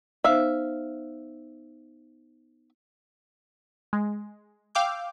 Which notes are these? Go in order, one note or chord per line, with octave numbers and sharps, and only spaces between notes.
B3 D#4 C5 E5 F5
G#3
F5 G5 D6 E6 G6